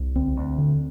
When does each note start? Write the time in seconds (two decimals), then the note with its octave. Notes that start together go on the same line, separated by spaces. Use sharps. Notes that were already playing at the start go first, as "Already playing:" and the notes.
Already playing: C2
0.16 D2 C4
0.37 D2
0.58 D3